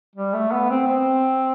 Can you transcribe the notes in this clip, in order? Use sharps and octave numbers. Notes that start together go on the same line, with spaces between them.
G3
A3
B3
C4
C4